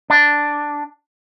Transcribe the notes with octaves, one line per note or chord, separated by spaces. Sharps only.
D4